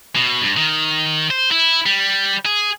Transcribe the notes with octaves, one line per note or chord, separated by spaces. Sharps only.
B2
G2
D#3
C5
E4
G3
G#4